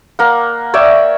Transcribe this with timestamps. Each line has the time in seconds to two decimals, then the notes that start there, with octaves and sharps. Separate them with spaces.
0.19 A#3 F#5
0.74 C#5 D5 E5 G5